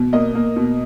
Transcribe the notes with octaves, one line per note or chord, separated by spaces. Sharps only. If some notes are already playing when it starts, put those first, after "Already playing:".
Already playing: B2
A#3 D#5
A#3
B2